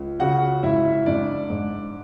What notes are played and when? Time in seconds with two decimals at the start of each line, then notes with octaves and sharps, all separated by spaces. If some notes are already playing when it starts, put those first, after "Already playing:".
Already playing: C#2
0.19 C#3 F#4 F#5
0.63 G#2 E4 E5
1.06 G#2 D4 D5
1.50 G#2